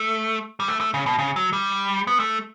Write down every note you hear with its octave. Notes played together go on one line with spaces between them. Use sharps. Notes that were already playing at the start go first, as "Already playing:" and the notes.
Already playing: A3
G3
A3
A3
C#3
B2
C#3
F#3
G3
B3
A3